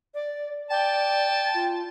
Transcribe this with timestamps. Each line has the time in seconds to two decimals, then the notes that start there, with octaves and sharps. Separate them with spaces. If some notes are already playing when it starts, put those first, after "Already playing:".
0.14 D5
0.70 D5 G5 A5
1.55 F4